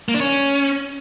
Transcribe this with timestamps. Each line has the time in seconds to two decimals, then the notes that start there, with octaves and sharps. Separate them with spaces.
0.09 A#3
0.14 D4
0.20 C#4